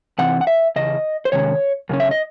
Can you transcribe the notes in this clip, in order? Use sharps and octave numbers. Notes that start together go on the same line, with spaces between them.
C3 E3 C4 F#5
F#5
E5
E2 C#3 D#5
C5
C3 D#3 G#3 C#4 C#5
F#2 C#3 C#4
E5
D#5